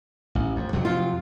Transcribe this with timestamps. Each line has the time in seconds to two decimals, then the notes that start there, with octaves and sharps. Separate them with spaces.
0.35 A1
0.56 F2
0.73 F2 C3 F#3
0.85 F4